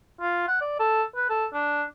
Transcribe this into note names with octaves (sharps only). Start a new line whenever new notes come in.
F4
F#5
D5
A4
B4
A4
D4